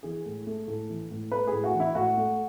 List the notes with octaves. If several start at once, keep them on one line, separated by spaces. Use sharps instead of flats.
E3 G#4
A2
A3
A2 A4
E3
A2
A3 B4
A2 G#4
F#4
E3
E4
A2 F#4
A3